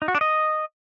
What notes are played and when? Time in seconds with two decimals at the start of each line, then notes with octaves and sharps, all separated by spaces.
0.02 D#4
0.08 F#4
0.15 D4
0.21 D#5